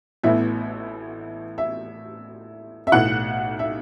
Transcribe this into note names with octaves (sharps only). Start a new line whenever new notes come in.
A1 A2 E3 B3 E5
E5
E5
B1 A2 E3 F#5
E5